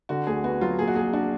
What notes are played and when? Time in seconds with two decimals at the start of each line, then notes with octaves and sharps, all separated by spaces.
0.09 D3 F#4
0.27 D2 G#4
0.44 B3 F#4
0.61 F#3 F4
0.79 A#2 G#4
0.88 F#4
0.96 A#1 G#4
1.13 D4 F#4